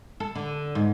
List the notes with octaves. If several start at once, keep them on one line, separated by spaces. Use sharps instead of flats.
A4
D3
G#2